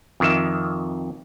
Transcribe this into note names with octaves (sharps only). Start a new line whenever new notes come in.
F2 D#3 E5